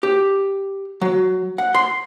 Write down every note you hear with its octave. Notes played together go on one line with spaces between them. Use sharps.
G4
F#3
F#5
C6